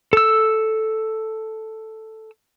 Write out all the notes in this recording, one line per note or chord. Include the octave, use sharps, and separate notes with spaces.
A4 E6